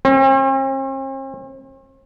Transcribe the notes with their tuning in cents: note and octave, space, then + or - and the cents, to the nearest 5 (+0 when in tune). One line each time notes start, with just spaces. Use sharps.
C4 +45